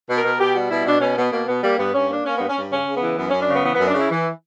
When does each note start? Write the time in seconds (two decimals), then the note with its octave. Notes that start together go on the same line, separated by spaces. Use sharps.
0.09 B2
0.17 A#4
0.24 B2
0.39 B2 G4
0.54 G3 F#4
0.71 B2 E4
0.85 B2 D4
1.01 B2 C#4
1.17 B2 B3
1.32 B2 A#3
1.48 B2 B3
1.63 G3 A#3
1.78 G2 B3
1.94 G2 C#4
2.09 A#3 D4
2.25 A#3 C#4
2.36 G2 B3
2.48 C#4
2.56 G2
2.72 C#3 C#4
2.87 C#3
2.94 B3
3.03 E3
3.17 F#2 B3
3.29 F#2 C#4
3.41 D4
3.49 C#3 B3
3.64 E3 B3
3.75 F#2 B3
3.87 D4
3.94 C#3 E4
4.11 E3